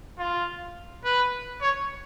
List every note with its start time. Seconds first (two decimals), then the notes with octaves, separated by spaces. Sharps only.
0.18 F4
1.05 B4
1.62 C#5